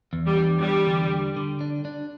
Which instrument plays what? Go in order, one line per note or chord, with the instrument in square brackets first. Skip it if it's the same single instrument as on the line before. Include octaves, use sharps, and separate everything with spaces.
[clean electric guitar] E2
[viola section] G3
[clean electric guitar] D4
[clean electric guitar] E2 [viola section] G3
[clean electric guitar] D3
G3
D3
D4
D4